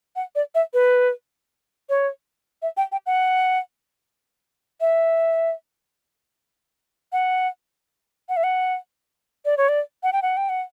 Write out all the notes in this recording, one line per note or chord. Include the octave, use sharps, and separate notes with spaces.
F#5
D5
E5
B4
C#5
E5
G5
G5
F#5
E5
F#5
F#5
E5
F#5
D5
C#5
D5
F#5
G5
F#5
G5
F#5